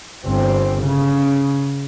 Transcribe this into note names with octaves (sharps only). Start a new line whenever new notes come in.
G1 C4
C#3